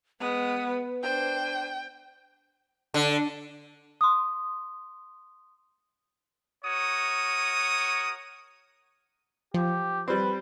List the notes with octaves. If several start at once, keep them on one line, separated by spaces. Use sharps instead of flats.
G#3 B3 B4 D#6
D4 C5 G5
D3
C6 D#6
F#4 A#4 C#5 D#6
F3 G4
G3 C4 B4